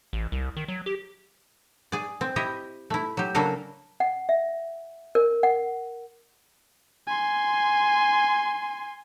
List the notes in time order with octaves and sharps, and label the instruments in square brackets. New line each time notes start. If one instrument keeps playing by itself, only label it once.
[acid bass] A1
C2
D#3
F#3
G4
[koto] G#4 D5
C4
E4 G4 D#5 E5
A3 E4
F#3 G4
C#3 F#3 A#3 D4 A4 A#4
[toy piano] F#5
E5
A#4
F#5
[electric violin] G#5 C6